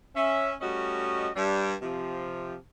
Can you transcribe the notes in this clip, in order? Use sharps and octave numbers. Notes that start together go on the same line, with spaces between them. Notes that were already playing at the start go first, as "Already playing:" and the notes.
C#4 E5
G3 A3 C#4 F#4 D#5
G2 G3 D4
C3 F3